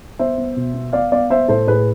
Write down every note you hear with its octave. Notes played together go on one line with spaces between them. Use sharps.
B3 C5 E5
B3
B2
B3
B3 D5 F5
B3 D5 F5
B3 C5 E5
A2 A4 C5
A2 G#4 B4